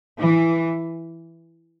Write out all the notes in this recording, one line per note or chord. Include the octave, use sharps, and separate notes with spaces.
E3